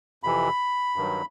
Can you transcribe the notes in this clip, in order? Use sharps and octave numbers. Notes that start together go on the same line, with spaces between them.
F2 C3 E3 B5
G2 D#3 F#3